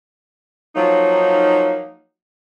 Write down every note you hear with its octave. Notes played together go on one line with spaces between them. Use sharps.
F3 F#3 A#3 D#4